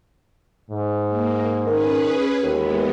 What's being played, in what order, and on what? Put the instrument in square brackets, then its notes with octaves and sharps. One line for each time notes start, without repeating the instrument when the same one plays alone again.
[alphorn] G#2
[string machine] A#3
[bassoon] D#3 [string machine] C#4 G#4 B4
[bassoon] D#2 [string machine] E3 G#3 B3